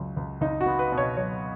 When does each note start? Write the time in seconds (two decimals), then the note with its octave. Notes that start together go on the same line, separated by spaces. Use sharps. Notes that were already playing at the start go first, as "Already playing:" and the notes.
Already playing: C#2 F#3
0.17 C#2
0.41 C#2 D#4
0.61 F#4
0.66 B3
0.79 B4
0.92 B2
0.98 C#5
1.17 F#3 C#5